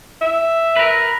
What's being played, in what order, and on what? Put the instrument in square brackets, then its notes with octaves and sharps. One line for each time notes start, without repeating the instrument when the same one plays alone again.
[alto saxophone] E5
[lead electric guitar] A#4 B4